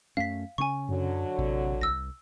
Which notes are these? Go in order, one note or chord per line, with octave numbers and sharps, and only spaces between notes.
F#2 A3 C#4 F5 B6
C#3 C4 C#4 G#5 C#6
F#2 D3 F#3
A1 C3
C2 E6 A#6